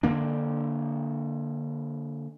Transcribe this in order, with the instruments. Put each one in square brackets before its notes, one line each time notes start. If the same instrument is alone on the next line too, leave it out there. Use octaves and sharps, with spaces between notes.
[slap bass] D3 A#3 D4